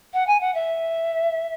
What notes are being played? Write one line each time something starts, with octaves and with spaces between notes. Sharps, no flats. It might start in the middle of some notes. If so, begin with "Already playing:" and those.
F#5
G#5
F#5
E5